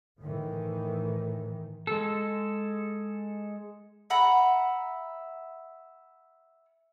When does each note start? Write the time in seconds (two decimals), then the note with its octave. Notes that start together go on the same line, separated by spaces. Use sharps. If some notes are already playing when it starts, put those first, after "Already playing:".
0.20 A2 D#3 E3
1.87 G#3 A4
4.10 E5 F#5 A#5 B5